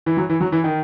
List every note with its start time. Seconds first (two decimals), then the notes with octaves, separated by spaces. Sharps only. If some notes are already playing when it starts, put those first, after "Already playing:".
0.06 E3
0.17 F#3
0.29 E3
0.40 F#3
0.52 E3
0.64 D#3